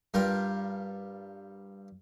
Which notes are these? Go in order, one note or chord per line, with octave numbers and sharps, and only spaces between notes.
G2 G3 F4 A#4 G5